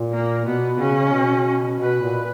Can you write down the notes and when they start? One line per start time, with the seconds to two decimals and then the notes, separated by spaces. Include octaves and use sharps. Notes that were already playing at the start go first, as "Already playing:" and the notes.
Already playing: A#2
0.12 A#3
0.45 B2 B3
0.79 C#3 C#4
1.13 B2
1.80 B2 B4
2.03 A#2